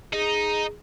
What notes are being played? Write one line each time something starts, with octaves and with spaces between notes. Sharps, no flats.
D#4 G#4